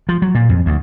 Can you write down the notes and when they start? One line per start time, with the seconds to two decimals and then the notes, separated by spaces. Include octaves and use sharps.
0.09 F3
0.22 F#3
0.35 A#2
0.49 F2
0.66 D2